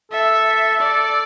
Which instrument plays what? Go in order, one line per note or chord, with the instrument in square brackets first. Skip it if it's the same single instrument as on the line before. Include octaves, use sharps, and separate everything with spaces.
[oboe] A4 [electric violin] E5
[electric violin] D5